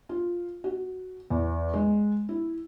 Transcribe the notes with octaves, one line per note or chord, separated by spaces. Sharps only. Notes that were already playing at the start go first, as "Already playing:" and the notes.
F4
F#4
E2
G#3
E4